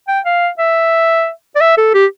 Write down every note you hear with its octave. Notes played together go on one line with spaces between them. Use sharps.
G5
F5
E5
D5
E5
A4
G4